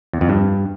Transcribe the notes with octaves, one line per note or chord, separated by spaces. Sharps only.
E2
F2
G2